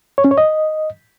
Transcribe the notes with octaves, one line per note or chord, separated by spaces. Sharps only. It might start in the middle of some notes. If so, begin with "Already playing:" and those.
C#5
C#4
C#5
D#5